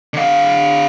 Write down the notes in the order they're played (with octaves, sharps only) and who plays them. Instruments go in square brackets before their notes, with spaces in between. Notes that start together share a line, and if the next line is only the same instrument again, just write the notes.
[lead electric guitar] D3 F5